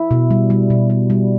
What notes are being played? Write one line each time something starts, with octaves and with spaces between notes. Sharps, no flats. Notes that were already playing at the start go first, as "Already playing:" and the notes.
Already playing: E4
B2
G3
G3
B2
G3
G3